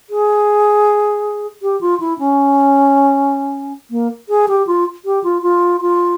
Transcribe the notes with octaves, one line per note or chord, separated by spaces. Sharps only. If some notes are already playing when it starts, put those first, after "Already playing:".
G#4
G4
F4
E4
C#4
A#3
G#4
G4
F4
G4
F4
F4
F4